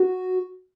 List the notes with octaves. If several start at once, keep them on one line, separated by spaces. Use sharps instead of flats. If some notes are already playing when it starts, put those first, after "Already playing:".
Already playing: F#4